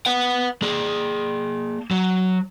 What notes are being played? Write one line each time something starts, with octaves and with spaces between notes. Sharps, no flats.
B4 F#5
A#3 G#4
F#3